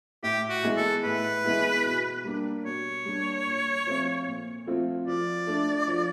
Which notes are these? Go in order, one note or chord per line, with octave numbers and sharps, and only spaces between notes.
A2 G4
F#4
E3 G#3 B3 E4
A4
A2 B4
E3 G#3 B3 E4
B2
G3 A#3 D4 G4
B2 C#5
G3 A#3 D4 G4
A#2
F3 A3 C4 F4
A#2
F3 A3 C4 F4
F3 D5
A3 D4
F3